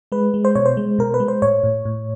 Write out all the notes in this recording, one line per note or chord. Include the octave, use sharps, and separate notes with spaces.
G#3 B4
G#3
C5
B2 C#5
C5
G#3
B2 A#4
B4
G#3
C5
A2 C#5
A2
A2